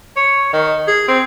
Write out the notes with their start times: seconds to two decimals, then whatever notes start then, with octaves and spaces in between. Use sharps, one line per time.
0.16 C#5
0.53 D#3
0.88 G#4
1.08 C4